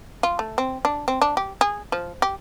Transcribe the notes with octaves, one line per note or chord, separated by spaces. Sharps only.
F4
A3
C4
D4
C4
D4
G4
G#4
F3
G4